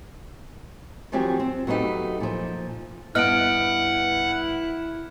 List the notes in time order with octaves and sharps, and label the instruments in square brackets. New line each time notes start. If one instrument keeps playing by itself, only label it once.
[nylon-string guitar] D#3 F3 F#3 C4 G4 G#5
C4
F#3 A3 B3 C#4 D#4 G4
A#2 F3
[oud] G2 B3 D#5 [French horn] E4 [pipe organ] F#5 [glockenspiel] F6 D7